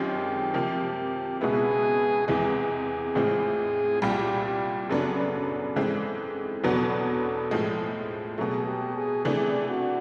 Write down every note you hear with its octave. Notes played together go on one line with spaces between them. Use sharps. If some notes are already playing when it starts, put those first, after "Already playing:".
Already playing: F#2 D#3 G#3 C4 F4 G4
C3 F3 A#3
C#2 B2 G#3 B3 E4 G#4
E2 C3 E3 G#3 G#4
A2 E3 G#3 C4 F4
C2 A#2 G3 G4
G4
F#2 C#3 F#3 B3 D4 A4
G#2 E3 G#3 C4
E2 B2 F#3 B3 D4
A2 F3 G#3
B2 F#3 A3 G#4
G4
G#4
C3 E3 A3 D4 G#4
F#4